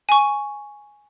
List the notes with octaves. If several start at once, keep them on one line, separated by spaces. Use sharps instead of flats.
G#5 C#6